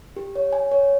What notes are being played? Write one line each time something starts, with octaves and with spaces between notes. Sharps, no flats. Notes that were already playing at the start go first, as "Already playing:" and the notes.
G4
C#5
G#5
C#5